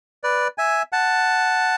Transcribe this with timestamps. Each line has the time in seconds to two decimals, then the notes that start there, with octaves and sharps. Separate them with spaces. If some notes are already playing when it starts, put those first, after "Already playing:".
0.24 B4 D5
0.58 E5 G#5
0.92 F#5 A5